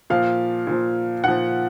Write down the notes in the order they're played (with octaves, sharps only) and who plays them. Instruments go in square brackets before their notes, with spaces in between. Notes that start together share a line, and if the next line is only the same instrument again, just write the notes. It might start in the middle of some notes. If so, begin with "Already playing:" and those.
[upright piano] A#2 F3 F5
A#2 F3
A#2 F3 F#5